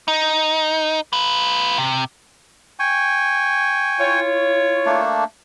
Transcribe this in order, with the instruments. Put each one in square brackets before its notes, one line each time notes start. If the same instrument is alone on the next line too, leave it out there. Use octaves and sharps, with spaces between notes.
[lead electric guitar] D#4
F4 B4
C3
[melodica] G5 G#5 C#6
[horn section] E4 F4 C#5
[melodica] A3 A#3 D4